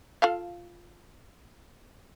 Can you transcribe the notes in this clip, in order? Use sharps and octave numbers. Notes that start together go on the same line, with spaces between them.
F4 A4 F5